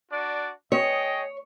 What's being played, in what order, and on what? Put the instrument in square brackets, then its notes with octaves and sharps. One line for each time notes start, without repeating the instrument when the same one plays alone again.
[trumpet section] D4 F#4 D5
[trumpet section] G#4 D#5 G5 [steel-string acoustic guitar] C#5